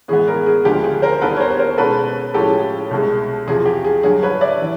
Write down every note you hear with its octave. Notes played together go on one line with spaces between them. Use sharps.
A2 E3 G#3 B3 G#4
G#4 A#4
G#4
D2 D3 F3 G#3 G4
G#4
A#4 C5
D#2 D#3 G3 B3 A4 B4
C#5
A#4 C5
A#4 C5
B2 G#3 C#4 A4 B4
A2 F3 G#3 C#4 G4 A4
C2 B2 G#3
E2 C3 F3 G#4
G4
G#4
G2 D3 F#3 G#4
B4 C#5
D5 E5
E3